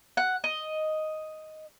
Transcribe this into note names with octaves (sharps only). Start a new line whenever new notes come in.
F#5
D#5